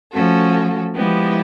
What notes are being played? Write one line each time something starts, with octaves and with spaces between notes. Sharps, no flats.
F3 A3 C#4 F#4 A4
F3 G#3 B3 E4 G4